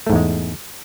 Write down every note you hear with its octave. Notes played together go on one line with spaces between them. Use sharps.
E2 G#2 G#3 A3